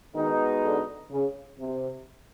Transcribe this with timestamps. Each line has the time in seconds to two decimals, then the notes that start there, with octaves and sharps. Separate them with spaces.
0.15 B2 D#3 G#3 B3 D#4
0.63 D3
1.11 C#3
1.58 C3